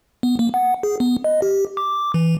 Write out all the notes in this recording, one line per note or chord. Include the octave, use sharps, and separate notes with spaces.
B3
A#3
F#5
G#4
B3
D#5
G4
D6
E3